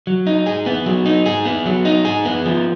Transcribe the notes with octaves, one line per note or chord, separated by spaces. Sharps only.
F#3
D#4
G#4
B3
F#3
D#4
G#4
B3
F#3
D#4
G#4
B3
F3